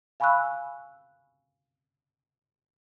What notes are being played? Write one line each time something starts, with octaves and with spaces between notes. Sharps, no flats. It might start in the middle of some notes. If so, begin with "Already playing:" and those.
F5 G#5 B5 C#6 E6 F#6